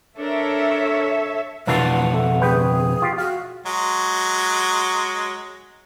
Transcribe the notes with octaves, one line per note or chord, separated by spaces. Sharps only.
D4 A4 A#4 C#5 E5
F2 B2 E3 D4 F4 A#4 F#5
A3
D2 G#4 B4 G5
F4 G4
F#4 F5
F#3 G#3